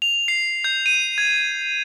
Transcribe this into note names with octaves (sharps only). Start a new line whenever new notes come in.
F7
C7
G6
D#7
G#6